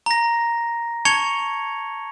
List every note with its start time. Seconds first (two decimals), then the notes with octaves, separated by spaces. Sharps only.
0.06 A#5 A#6
1.05 A5 C#6 G#6 C#7 F7 G7